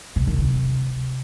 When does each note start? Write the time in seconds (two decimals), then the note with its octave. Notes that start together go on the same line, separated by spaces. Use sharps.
0.16 C3
0.27 D#3
0.38 C3